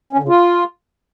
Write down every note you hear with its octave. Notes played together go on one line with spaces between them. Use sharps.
C#4
D3
C#3
F4